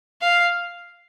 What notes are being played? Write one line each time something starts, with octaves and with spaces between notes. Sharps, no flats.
F5